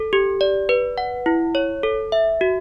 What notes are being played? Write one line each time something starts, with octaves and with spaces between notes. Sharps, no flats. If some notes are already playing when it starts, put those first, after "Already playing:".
Already playing: A4
G4
D5
B4
F#5
E4
C#5
A4
E5
F#4